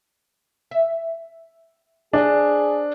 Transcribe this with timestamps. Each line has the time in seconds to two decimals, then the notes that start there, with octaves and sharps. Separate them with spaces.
0.71 E5
2.13 D4 G#4 C5 D#5